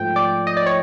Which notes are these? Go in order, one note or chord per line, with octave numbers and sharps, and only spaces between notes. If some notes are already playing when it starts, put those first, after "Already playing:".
Already playing: G#2 F3 A3 G5
D5
D#5
D5
C#5